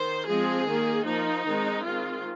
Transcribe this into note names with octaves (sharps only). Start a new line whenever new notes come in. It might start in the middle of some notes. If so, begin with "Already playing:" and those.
Already playing: D#3 C5
F3 G#3 C4 G#4
D#3 A#3
F3 A#3 D#4
D#3 G#3 C4
D#3 G#3 C4 F4